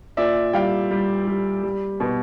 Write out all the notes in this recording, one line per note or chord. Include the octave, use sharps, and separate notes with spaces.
A#2 D5 E5
G3 F5 G5
G3
G3
G3
B2